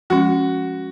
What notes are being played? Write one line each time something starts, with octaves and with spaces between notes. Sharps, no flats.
F3 G#3 C#4 F#4